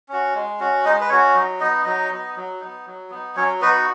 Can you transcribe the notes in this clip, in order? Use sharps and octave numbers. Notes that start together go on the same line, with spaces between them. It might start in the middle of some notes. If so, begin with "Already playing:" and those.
C#4 F#4
G#3
C#4 F#4
G#3 D#4 D#5
B4
C#4 F#4 C#5
F#3 D#4 D#5
B3 D#4 D#5
F#3 D#4 D#5
B3 D#4
F#3
B3 D#4
F#3
B3 D#4
F#3 C#4 C#5
B3 D#4 F#4 B4